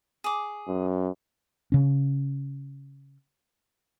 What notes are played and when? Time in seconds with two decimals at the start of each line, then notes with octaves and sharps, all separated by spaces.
0.24 G#4 D6
0.68 F#2
1.72 C#3 C#4